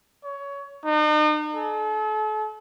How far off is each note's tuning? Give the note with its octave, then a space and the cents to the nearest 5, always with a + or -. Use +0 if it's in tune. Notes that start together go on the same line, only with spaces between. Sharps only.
C#5 +20
D#4 -40
A4 -40